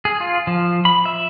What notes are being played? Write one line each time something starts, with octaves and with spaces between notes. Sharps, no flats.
G#4
F4
F3
B5
E5